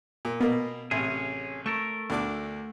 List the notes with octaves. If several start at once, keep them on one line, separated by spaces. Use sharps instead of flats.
A#2
B2 A#3 B3
A1 C3 C#4 G#4
A3 A4 A#4 C#6
D2 D4 D6